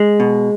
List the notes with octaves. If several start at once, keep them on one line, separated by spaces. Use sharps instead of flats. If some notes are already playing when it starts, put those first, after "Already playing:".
Already playing: G#3
B2